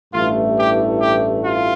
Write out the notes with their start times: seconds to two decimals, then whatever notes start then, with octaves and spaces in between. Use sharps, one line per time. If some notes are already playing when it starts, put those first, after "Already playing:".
0.14 A1 G2 E3 A3 F4
0.58 G4
1.01 G4
1.44 F4